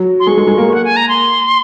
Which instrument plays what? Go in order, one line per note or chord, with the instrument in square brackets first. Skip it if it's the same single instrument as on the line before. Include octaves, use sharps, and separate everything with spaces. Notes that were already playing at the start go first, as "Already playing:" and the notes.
Already playing: [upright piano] F#3 F#4
[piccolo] C6
[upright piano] G#3 G#4 [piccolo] C#6
[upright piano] G#3 G#4
G#3 G#4
A#3 A#4
[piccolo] F#5
G#5
A#5
C6